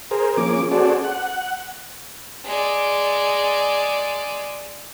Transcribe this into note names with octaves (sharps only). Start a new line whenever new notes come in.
G#4 A#4 C5
F3 A#3 C#4 G#4 D6
C#4 F#4 G#4 A4 C5 D5
F#5
G#3 D5